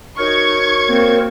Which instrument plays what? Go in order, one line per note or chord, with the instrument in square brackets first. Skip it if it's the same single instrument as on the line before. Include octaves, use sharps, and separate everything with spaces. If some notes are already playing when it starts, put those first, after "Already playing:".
[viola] D#4 [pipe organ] F#4 A#4 C#5 [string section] C#6 G#6
[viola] A#3 C4